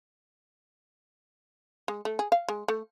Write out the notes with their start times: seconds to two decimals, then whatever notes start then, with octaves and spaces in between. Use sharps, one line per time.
1.88 G#3
2.05 A3
2.19 G#4
2.32 F5
2.48 G#3
2.68 A3